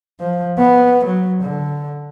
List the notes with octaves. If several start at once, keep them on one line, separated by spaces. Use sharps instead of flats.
F3
B3
F#3
D3